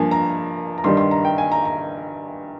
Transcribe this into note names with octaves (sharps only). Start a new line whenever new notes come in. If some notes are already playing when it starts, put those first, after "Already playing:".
Already playing: G2 F3 A#3 G#5
A#5
A#5
G2 D#3 G3 C6
C6
A#5
G5
G#5
A#5
A#5